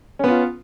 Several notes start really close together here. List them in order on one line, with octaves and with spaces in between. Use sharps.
C#4 B3 F4